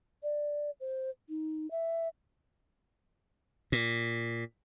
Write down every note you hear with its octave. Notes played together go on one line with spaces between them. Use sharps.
D5
C5
D#4
E5
A#2